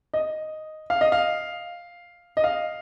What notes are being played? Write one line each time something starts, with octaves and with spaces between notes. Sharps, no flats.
D#5
F5
D#5
F5
D#5
F5